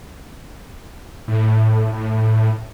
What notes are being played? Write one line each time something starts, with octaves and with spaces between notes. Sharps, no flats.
A2
A2